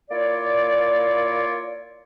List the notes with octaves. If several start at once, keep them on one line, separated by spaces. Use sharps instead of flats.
A#3 E4 F4 C#5 D5